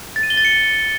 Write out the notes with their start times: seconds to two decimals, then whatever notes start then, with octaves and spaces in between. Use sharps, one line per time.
0.16 A6
0.23 D#7
0.30 G7
0.37 A6
0.45 C#7